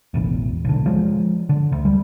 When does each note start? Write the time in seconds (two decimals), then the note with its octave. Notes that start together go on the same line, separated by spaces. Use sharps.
0.14 E1 A1 E2
0.65 B1 D3
0.86 F3 G#3
1.49 D3
1.72 D2
1.85 G3